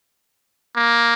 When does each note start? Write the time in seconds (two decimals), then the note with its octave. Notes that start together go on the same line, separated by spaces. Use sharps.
0.77 A#3